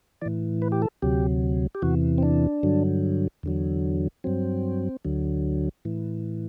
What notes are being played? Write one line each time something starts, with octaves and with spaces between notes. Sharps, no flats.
A2 E3 D5
B4
G4
A4
D2 C3 F#3 G4
G4
E2 C3 E3 F#4
C4
D4
G2 D3 F#3
E2 D3 F#3
G2 F#3 C4
D2 D3 F#3
A2 E3